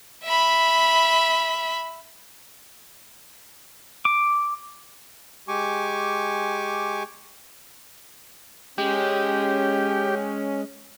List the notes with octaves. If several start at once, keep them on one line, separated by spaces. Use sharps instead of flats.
E5 B5
D6
G#3 G4 G#5 C#6 D6
G#3 C#4 G4